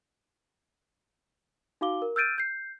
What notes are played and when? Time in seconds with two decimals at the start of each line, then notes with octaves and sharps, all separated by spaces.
1.81 D#4 F#4 F5 D6 G7
2.02 A#4
2.16 E6 F6 G6 A6 D7 D#7
2.38 G6 C7